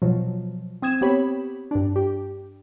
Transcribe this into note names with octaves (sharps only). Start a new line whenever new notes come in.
B2 F3 F#3
C4 D#6 G#6 E7
B3 C4 G4 C#5 B5
G2 D4
G4